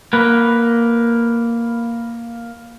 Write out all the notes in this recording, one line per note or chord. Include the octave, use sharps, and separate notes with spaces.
A#3 B4